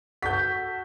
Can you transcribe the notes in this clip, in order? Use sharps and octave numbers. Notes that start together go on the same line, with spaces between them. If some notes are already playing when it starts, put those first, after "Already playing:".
F#4 A4 G6 B6